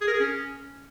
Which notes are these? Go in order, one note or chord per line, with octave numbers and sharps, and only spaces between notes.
G#4
A#4
G#4
C#4